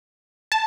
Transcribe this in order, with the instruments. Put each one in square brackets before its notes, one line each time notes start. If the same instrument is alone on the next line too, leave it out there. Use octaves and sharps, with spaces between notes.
[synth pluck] A5